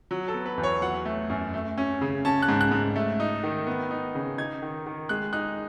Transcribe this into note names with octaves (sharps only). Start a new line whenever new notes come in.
F#3
A4
B3
B4
E2
C#5
F#3 F#5
A3
F#2
A3
C#4
C#3
C#4 A5
F#6
G#2
F#6
G#2
A3
D#4
D#3
B3
D#4
C#3
D#4 G#6
D#3
D#3
G#3 F#6
D#4 F#6